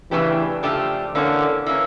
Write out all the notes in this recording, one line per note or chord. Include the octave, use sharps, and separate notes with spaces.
C#3 E3 F3 A3 D4 G4
C#3 F3 A3 D4 G4
D3 E3 A#3 C#4
E3 A#3 C#4